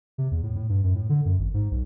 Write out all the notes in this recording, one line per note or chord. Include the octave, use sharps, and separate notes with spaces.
C3
E2
A2
A2
G2
F#2
A2
D3
F#2
G#1
G#2
B1